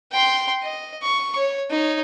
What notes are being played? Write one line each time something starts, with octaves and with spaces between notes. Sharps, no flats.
G5 C6
D#5
C#6
C#5
D#4 C#5